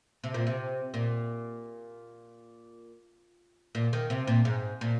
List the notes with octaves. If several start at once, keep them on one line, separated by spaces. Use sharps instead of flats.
C3
A#2
C3
A#2
A#2
D#3
C3
A#2
G#2
A#2